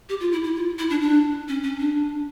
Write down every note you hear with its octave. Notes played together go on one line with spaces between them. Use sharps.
G4
F4
E4
E4
F4
E4
D4
D4
C#4
C#4
D4